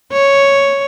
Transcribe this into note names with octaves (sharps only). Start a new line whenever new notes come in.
C#5